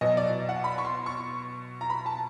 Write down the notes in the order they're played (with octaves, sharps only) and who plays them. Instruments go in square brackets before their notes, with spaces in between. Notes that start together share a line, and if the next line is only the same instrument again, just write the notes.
[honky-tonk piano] B2 F#3 D#5
D5
F#5
B5
C#6
C6
C#6
A#5
B5
A5